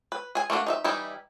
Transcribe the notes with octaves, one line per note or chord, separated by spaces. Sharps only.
B4
G#4 G#5
A3 A#3 D4 F#4
D#4 D#5 E5
E3 G3 D#4 E4